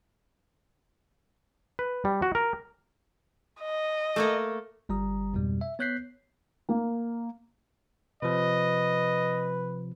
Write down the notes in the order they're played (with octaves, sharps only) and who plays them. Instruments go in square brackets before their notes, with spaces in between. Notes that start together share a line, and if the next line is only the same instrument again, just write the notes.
[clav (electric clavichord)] B4
G3
F#4
A#4
[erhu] D#5
[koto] A3 A#3 A4
[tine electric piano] G1 G3 A#5 D#6
F2 G#2 B2 G3
E5
B3 C#5 F#6 G6 B6 C7
[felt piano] A#3
[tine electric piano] C3 F3 [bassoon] B4 [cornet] D#5